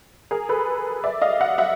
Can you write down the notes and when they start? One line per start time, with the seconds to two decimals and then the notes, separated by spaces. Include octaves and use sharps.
0.31 G#4 A#4
0.49 A4 B4
1.04 D5 E5
1.22 D#5 F5
1.40 E5 F#5
1.58 E5 F#5